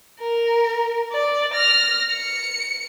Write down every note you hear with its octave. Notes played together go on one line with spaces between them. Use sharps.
A#4
D5
F6 A#6
C#7